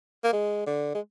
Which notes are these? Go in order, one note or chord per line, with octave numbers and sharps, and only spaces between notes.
A#3
G#3
D3
G#3